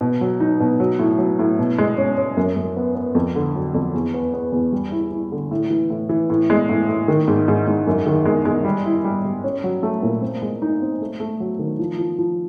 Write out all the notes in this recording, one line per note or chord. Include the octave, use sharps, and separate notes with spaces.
B2
F#3
D#4
B2
F#3
A2
F#3
A2
B2
G#3
C#4
C#4
F#2
F#2
B3
B3
F2
D3
F#3
F2
E2
B3
B3
E2
G3
E4
E4
D3
A2
E3
A2
E3
A2
G#3
A2
A2
D#3
G#2
G#2
G#2
F#2
D#3
G#3
G#3
G3
E4
G3
G3
C#4
F#3
A3
A#2
C4
G#3
D#4
C4
A3
A3
F#3
D#3
F3
F3
F3